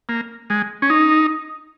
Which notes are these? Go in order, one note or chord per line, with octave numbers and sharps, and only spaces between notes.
A#3
G#3
C#4
D#4